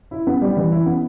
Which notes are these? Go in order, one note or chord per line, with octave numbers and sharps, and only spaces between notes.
E4
B3
G3
E3
E4
B3